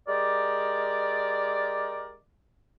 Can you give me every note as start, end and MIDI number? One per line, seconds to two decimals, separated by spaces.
0.08 2.13 56
0.08 2.13 67
0.08 2.13 70
0.08 2.13 74